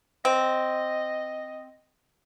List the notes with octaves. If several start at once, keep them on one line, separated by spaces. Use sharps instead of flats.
C4 D#5